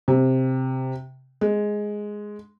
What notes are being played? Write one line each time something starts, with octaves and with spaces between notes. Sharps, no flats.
C3
G#3